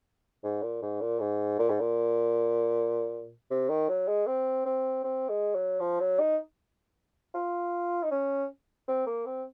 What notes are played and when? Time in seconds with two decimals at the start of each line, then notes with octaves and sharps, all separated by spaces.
0.44 G#2
0.62 A#2
0.82 G#2
1.01 A#2
1.20 G#2
1.59 A#2
1.69 G#2
1.80 A#2
3.51 C3
3.69 D#3
3.89 F#3
4.08 G#3
4.27 C4
4.65 C4
5.04 C4
5.29 G#3
5.55 F#3
5.80 F3
6.00 F#3
6.19 D#4
7.34 F4
8.03 D#4
8.11 C#4
8.88 C4
9.06 A#3
9.26 C4